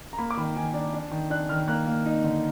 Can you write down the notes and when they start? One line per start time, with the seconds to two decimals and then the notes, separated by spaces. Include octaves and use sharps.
0.13 A#5
0.18 A#3 B5
0.31 D6
0.37 D#3 B5
0.56 D#3 G#5
0.74 D4
0.94 D4
1.11 D#3
1.30 D4 F#6
1.49 D#3 F6
1.68 A#3 F#6
1.87 A#3
2.06 D#4
2.24 D3